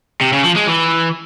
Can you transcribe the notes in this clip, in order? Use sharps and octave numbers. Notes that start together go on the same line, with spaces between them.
C3
C#3
F3
G#3
E3